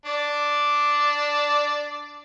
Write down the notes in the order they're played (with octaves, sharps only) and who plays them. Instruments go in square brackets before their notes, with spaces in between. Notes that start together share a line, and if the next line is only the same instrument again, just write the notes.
[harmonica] D4 D5